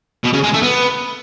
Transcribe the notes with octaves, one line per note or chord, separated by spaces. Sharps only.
B2
C#3
G#3
A3
B3